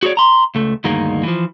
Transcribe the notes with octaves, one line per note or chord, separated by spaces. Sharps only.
F#4 G#4 A4 C#5 D5
A#5 C6
C#2 A3
D2 G2 D#3 G#3 A#3
E3 F3